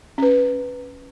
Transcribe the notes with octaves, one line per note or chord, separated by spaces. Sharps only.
C#4 B4